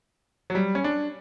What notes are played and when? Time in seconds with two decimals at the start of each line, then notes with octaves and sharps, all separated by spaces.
0.50 F#3
0.55 G3
0.75 C#4
0.84 D4